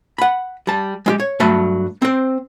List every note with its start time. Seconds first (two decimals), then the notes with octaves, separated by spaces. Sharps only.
0.18 F#5 B5
0.67 G3 A5
1.06 G#3 F4 G4
1.20 C#5
1.40 G2 F#3 A3 A5 B5
2.02 C4 C5